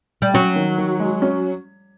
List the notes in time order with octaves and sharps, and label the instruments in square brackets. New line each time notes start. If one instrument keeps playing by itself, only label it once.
[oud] G3
[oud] F#3 [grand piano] C#4
[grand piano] D#3
D#3
G#3
C#4